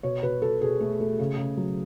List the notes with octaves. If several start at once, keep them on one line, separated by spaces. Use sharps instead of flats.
B2 C#5
B2 B4
B2 A4
B2 G#4
A3
A3
C#3
C#3
F#3